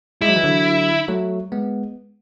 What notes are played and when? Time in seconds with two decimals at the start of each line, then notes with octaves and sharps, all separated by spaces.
0.21 G#3 E4
0.29 F#3
0.36 E3
0.43 D3 F#3
1.08 F#3 A3
1.52 G#3 B3